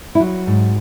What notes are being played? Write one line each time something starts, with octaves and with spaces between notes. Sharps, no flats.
E4
F#3 F#4
G#2